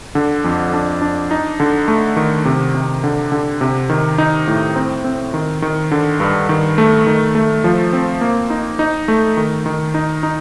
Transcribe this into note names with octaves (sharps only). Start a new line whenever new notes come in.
D3
F2
D4
D4
D#4
D3
A3
D#3
C3
C3
D3
D3
C3
D#3
D#4
A2
C4
C4
D#3
D#3
D3
G2
D#3
A3
D#3
A3
F3
C4
A#3
D#4
D#4
A3
D#3
D#3
D#4
D#4